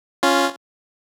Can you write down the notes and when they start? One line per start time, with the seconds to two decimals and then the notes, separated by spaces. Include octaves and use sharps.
0.23 C#4 F4